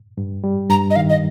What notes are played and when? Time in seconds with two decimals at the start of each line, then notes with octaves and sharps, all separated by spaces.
0.17 G2
0.44 G3
0.70 G2 A#5
0.90 D#5
0.96 D#3 F5
1.09 D#5